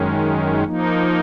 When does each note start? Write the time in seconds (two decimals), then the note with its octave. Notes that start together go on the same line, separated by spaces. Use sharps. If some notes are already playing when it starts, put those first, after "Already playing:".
Already playing: F#2 D#3 G#3 C#4
0.64 F3 A#3 D#4